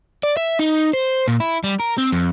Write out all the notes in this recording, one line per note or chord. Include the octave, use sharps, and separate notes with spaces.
D5
E5
D#4
C5
A#2
E4
G3
A#4
C4
F2